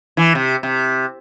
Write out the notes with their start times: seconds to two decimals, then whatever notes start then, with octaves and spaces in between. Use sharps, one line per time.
0.17 E3
0.35 C3
0.63 C3